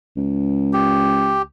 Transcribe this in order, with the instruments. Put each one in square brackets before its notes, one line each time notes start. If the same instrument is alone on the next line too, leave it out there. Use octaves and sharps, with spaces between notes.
[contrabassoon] C#2
[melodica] G4